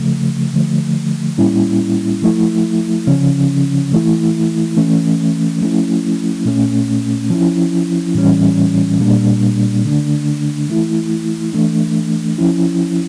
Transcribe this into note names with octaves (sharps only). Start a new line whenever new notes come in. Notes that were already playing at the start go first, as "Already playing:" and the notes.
Already playing: C#3 F3 A3
D3 F3 A3
A2 G3 A#3 C#4 E4
F3 A3 E4
C#3 F3 C#4
E3 A3 E4
E3 A3 C#4
F3 A3 C#4 E4
A#2 A3 C#4
F3 C#4 E4
A2 E3 G3 C#4
A#2 G3 A#3 D4
D3 A3 D4
E3 A3 E4
E3 A3 D4
F3 C#4 E4